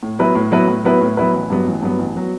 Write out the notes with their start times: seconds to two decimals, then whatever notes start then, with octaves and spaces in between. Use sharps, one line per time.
0.03 A2
0.19 F#3 B3 E4 B4
0.35 A2
0.51 F#3 B3 E4 B4
0.68 A2
0.84 F#3 B3 E4 B4
1.01 A2
1.17 F#3 B3 E4 B4
1.34 A1
1.50 G2 F#3 B3
1.67 A1
1.83 G2 F#3 B3
1.99 A1
2.16 F#3 B3